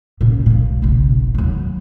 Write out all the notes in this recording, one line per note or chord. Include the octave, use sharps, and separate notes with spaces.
A#2 C#4
B1 A#2
F#1 B1
D#2 F#3